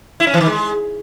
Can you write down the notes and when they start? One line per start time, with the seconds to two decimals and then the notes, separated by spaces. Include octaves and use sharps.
0.20 E4
0.27 C#4
0.34 E3
0.41 D#3
0.47 G#3